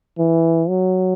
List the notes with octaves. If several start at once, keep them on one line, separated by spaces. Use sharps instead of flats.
E3
F#3